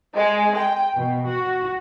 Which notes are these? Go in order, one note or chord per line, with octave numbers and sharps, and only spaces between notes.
G#3
G5
B2
F#4